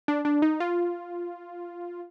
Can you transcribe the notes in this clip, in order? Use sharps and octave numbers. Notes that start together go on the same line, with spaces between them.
D4
D4
D#4
F4